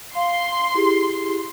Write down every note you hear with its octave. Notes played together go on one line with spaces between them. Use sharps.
F5 C6
E4 G4 G#4